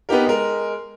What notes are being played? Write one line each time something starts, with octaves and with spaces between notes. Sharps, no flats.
B3 D#4 G4 A#4
G#3 A#4